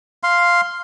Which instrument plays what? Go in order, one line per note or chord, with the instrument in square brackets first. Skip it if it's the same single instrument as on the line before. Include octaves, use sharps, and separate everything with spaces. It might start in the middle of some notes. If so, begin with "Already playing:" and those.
[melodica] F5 C6